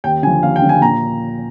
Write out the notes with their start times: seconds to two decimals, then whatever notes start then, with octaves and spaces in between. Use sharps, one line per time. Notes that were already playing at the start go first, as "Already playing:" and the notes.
0.04 D#2 G5
0.23 D3 G#5
0.27 F3
0.43 D#2 F5
0.56 G5
0.62 D3 F3
0.69 G#5
0.82 A#2 A#5